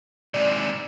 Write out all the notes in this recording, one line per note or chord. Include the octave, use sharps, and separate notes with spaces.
G#2 C3 D5